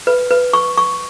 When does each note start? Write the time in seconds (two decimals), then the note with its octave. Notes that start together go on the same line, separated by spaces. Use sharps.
0.07 B4
0.31 B4
0.53 C#6
0.78 C#6